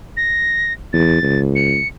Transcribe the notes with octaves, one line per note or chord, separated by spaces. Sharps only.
A#6
E2 A6
C#2
C#7